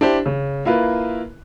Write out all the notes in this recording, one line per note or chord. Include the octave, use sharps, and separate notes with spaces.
D4 E4 G4 C5
C#3
A#3 E4 F4 B4